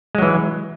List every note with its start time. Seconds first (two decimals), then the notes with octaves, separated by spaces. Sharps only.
0.15 G#3
0.18 F#3
0.22 E3